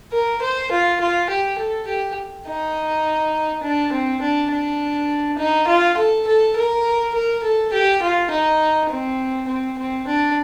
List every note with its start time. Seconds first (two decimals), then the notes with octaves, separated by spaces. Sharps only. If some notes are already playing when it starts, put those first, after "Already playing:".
0.12 A#4
0.42 C5
0.71 F4
1.00 F4
1.30 G4
1.58 A4
1.87 G4
2.47 D#4
3.63 D4
3.92 C4
4.22 D4
4.51 D4
5.38 D#4
5.68 F4
5.97 A4
6.27 A4
6.56 A#4
7.14 A#4
7.43 A4
7.73 G4
8.02 F4
8.31 D#4
8.90 C4
9.48 C4
9.78 C4
10.07 D4